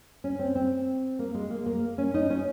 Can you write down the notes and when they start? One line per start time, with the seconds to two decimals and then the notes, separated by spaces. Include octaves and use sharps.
0.24 C#4
0.39 C4
0.55 C4
1.19 A#3
1.34 G#3
1.50 A#3
1.66 A#3
1.98 C#4
2.14 D#4
2.30 C#4